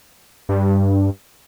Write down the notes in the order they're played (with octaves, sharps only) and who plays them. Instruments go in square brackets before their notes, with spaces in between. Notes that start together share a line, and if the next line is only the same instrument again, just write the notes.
[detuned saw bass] G2